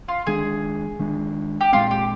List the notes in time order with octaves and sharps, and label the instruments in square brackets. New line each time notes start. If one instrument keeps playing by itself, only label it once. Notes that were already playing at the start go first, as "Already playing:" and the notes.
[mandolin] F4
[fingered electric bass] D#3 G#3 D4 [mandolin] G#4
[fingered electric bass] D#3 G#3 D4
[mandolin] G4
[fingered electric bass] A#2 G#3 C4 [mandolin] F4
[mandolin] G4